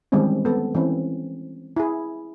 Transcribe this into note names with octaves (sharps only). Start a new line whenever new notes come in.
D#3 E3 G3 G#3 C4 C#4
B3 A4
E3 C4 C#4
E4 G#4